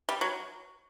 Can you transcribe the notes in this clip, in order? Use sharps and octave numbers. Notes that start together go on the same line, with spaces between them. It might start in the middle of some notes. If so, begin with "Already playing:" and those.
G3
F#3